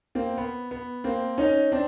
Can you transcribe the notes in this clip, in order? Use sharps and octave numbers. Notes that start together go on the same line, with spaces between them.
A#3 C4
B3
B3
A#3 C4
C#4 D#4
C4 D4